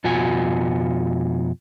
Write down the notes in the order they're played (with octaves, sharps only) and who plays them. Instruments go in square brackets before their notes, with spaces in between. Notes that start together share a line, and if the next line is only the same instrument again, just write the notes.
[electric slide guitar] F2 B2 F4 F#4 G#5